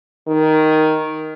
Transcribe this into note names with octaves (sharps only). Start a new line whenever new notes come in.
D#3